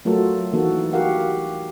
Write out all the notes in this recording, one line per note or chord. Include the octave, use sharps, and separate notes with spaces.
F#3 A3 F4 F#4 A4 A#4
E3 A#3 D#4 F#4 A4
F#4 G4 A#4 F5 F#5